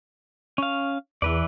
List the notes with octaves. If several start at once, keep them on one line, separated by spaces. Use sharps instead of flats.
C#4 F5
E2 E3 B4 D5